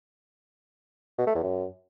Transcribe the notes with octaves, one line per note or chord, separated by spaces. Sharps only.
B2
A3
E2
F#2